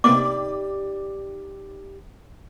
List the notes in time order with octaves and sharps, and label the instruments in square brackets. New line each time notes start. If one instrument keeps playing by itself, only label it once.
[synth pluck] C3 A#3 B3 [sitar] D#4 G4 D5 [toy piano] D6